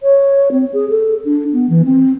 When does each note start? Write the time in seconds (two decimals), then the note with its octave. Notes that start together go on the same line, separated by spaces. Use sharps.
0.03 C#5
0.52 C4
0.73 G#4
0.90 A4
1.25 D4
1.53 B3
1.69 E3
1.85 C4